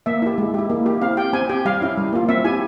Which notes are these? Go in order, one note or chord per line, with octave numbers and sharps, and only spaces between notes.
A#3 E5
E4 G4
G#3
E4 G4
A#3
E4 G4
C4 F5
G4 G5
C4 G#5
G4 G5
G3 F5
C#4 E4
G3
A#3 F4
C4 E5
E4 G4 G#5